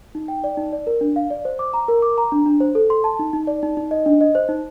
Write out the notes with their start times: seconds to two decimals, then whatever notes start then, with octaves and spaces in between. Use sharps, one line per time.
0.15 D#4
0.28 G5
0.44 D5
0.57 D#4
0.73 D5
0.87 A#4
1.01 D4
1.16 F5
1.30 D5
1.45 C5
1.59 D6
1.73 A#5
1.88 A#4
2.02 D6
2.18 A#5
2.32 D4
2.46 D4
2.60 C5
2.75 A4
2.90 C6
3.04 A5
3.19 D#4
3.33 D#4
3.47 D5
3.63 D#4
3.77 D#4
3.91 D#5
4.06 D4
4.21 D#5
4.35 C5
4.49 D#4